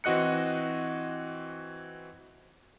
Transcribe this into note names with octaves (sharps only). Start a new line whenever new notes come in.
E3 C4 F#4 D#5 F#6 C#7